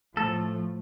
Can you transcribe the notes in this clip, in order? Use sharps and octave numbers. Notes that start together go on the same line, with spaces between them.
A2 F3 A3 A4